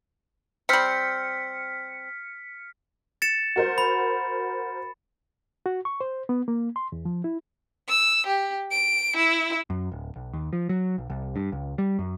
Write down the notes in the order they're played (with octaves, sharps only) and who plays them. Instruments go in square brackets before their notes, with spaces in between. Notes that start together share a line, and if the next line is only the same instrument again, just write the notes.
[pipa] G3 C4 [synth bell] F6 B6 C#7
[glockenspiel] A6 C#7 E7
[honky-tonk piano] F#4 A#4 C5
[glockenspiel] B5
[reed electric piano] F#4
C#6
C5
B3
A#3
C6
E2
F3
E4
[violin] E6
G4
D7
E4
[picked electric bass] F#2
D1
B1
D#2
F3
F#3
B1
C2
G2
C#2
G3
F#2